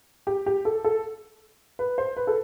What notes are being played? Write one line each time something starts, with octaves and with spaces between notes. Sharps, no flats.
G4
G4
A4
A4
B4
C5
B4
A4